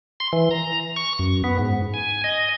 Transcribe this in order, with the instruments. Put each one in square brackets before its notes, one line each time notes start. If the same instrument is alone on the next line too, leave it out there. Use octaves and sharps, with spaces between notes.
[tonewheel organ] C6
E3
A#5
C#6
F#2
B3
G#2
G#5
D#5